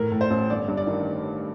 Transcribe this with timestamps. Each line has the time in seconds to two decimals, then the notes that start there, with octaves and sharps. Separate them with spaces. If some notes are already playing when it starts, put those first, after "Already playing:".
Already playing: A2 A#4
0.12 A2
0.21 C5
0.31 A1
0.50 G1 D5
0.68 G2
0.77 D5
0.87 D#3